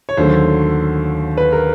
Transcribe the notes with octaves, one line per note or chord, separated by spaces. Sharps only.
C#5
D#2 D3 F#3 A3 C5
B4
A#4